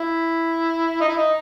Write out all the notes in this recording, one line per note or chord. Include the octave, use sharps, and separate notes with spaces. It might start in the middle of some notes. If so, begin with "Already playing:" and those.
Already playing: E4
D#4
E4
D#4